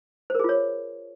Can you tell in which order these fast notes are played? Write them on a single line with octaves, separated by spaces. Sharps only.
C5 A#4 G#4 F4 C#5